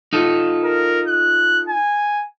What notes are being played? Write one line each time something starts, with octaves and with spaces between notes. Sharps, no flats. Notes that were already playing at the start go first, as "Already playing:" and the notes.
D#4 F4 A4
A#4
F#6
G#5